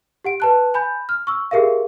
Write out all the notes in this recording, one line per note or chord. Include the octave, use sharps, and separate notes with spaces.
G4 F#5 D7
B4 A5 F#6
G#5 B5 G6
F6
C#6 E6
G4 G#4 A#4 E5 F5